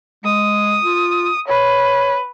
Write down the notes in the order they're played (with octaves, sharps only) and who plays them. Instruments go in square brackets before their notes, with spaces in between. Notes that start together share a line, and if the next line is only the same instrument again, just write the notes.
[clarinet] G#3 [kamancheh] D#6
[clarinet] F4
[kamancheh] B4 [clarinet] C#5